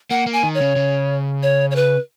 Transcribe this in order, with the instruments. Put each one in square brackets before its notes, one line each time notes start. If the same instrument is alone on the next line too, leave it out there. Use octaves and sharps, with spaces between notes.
[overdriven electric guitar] A#3 [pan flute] F#5
[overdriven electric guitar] A#3
[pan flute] G#5
[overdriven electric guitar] D#3
[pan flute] C#5
[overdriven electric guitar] C#3
C#3
[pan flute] C#5
C#5
B4